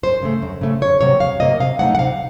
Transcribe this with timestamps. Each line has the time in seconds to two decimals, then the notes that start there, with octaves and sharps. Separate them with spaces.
0.03 F#2 C5
0.22 C#3 A3
0.42 F#2
0.61 C#3 A3
0.81 F2 C#5
1.01 C3 F#3 A#3 C#5
1.20 F2 F5
1.40 C3 F#3 A#3 D#5
1.60 C3 F5
1.79 F#3 A3 C4 D#4 F#5
1.95 F#5
1.99 C3 F5